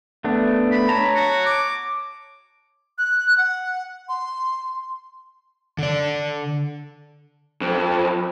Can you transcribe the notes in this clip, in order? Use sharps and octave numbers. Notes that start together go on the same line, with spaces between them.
A3 B3 D4
B5
C#5 A5 A#5
F#4
D6
F#6
F#5
C6
D3 D5
F2